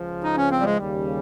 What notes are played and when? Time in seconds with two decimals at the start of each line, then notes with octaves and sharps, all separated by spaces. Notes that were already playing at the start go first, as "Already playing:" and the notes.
Already playing: C#2 C#3 F3
0.23 D#4
0.37 C#4
0.51 C4
0.59 G3
0.65 G#3
0.79 D#2 C#3 G3